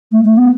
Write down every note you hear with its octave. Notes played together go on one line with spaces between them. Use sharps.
A3
A3
B3